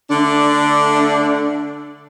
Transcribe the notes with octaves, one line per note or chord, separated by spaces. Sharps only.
D3 A3 D4